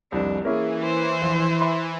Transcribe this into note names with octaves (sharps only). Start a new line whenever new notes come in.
F1 C2 D4
E3 A#3 C#4 E4 G#4
C5
A#1
E5 B5 C6